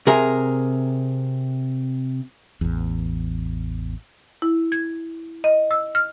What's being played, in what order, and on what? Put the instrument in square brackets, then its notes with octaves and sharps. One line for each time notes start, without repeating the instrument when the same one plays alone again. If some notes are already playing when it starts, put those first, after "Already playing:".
[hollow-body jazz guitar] C3 G#4 A#4
[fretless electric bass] A1 E2
[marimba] E4
G#6
D#5
E6
F6